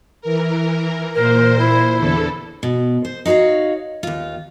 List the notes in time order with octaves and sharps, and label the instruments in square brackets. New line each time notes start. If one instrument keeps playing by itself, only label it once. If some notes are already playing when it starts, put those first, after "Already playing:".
[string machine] E3 A#4
[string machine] A#2 C5 [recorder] A#4
[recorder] E4
[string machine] E2 D3 A4
[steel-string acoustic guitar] B2
C5
D#4 F#4 G#4 C#5 F5
D#2 F4